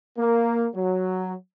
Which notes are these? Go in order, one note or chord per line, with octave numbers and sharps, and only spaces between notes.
A#3
F#3